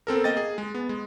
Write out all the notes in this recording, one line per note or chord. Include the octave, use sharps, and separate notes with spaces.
B3 C4 A4 A#4
A#3 D#5 G5 A6
G#4
G#3
B3
G#3